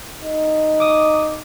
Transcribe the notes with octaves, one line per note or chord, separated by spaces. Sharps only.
D#4
D6 D#6